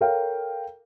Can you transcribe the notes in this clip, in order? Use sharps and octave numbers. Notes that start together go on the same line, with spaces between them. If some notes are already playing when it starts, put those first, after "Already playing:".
A4 A#4 C#5 F5 G5